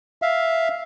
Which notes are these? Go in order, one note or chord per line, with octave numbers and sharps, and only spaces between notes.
E5 F5